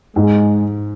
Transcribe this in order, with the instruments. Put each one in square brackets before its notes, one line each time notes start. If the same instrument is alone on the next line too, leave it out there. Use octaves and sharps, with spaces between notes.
[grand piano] G#2 [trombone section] G#3